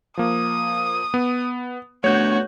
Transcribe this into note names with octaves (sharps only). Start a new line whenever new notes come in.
F3 A#3 D#6
B3
A3 B3 D4 F#4 C#5 G6